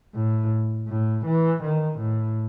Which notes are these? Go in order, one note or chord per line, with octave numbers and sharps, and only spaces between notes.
A2
A2
E3
D#3
A2